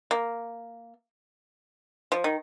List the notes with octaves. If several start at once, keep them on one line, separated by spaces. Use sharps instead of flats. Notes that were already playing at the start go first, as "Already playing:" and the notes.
A#3
F3
D#3